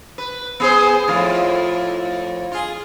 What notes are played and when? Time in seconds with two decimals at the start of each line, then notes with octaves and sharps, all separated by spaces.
0.18 B4
0.60 B3 G#4 C5
1.08 F2 A2 F4
2.52 F4 G#4